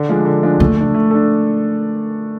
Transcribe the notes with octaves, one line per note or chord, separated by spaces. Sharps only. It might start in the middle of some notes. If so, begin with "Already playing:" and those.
Already playing: D3
F3 G#3 D4
D3
F3 G#3 D4
D3 A3
D4 A4
A3
D4 A4